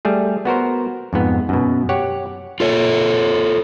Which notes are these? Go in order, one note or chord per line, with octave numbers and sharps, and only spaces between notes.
G3 A3 G#4
B3 F#4 A#4 C5
F2 G#2 B3
F#2 B2
G4 C#5 F#5
F4 A4 C#5